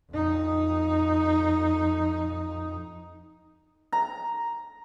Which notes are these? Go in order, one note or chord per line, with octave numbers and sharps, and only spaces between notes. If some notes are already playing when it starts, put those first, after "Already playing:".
F2 D#4
A#5